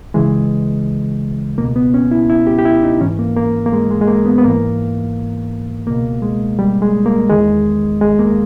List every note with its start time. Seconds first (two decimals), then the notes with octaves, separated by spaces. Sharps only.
0.14 C#2 C#3 E3 G#3
1.58 C#2 B2 A#3
1.76 B3
1.94 C#4
2.11 E4
2.30 E4
2.47 G4
2.58 G4
2.65 E4
2.84 D#4
3.00 G#2 E3 C#4
3.19 A#3
3.36 A#3
3.66 A#3
3.73 G#3
3.90 G#3
4.01 G#3
4.08 A#3
4.26 B3
4.38 B3
4.44 G#2 E3 A#3
5.87 C#2 B2 A#3
6.22 G#3
6.59 G3
6.82 G#3
7.06 A#3
7.30 E2 D#3 G#3
8.01 G#3
8.19 A#3